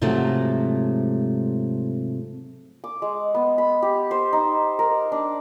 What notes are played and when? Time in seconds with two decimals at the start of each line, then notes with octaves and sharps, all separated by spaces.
0.02 G#2 C3 F3 F#3 A3
2.84 D6
3.02 G#3
3.34 B3
3.58 B5
3.82 G4
4.11 C5
4.33 D#4
4.79 A#4
5.12 D4